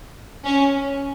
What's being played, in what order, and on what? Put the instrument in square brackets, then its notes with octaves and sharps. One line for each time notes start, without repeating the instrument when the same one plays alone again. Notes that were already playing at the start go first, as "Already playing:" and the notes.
[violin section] C#4